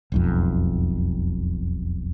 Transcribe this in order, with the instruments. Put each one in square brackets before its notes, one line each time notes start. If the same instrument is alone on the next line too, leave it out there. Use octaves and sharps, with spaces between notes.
[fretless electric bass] E1 B1 F2